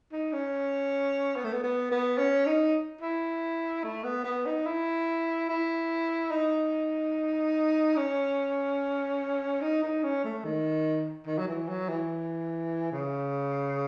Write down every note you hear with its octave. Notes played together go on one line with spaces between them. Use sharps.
D#4
C#4
B3
A3
B3
B3
B3
C#4
D#4
E4
A3
B3
B3
D#4
E4
E4
D#4
C#4
D#4
D#4
C#4
A3
D#3
D#3
F#3
E3
F#3
E3
C#3